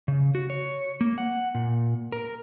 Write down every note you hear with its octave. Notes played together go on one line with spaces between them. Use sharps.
C#3
F#4
C#5
A#3
F#5
A#2
A#4